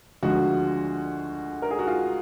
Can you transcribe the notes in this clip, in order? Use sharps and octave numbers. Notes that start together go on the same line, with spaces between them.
D2 D3 F3 G#3 F#4
A#4
G#4
F#4
F4